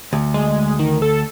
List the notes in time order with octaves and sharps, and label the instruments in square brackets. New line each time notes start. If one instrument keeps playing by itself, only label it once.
[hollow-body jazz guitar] D2
[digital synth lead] G#3
D#3
A4